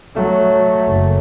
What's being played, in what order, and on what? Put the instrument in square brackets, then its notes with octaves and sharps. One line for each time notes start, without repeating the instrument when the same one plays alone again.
[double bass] F#3 [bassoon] A3
[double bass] F#1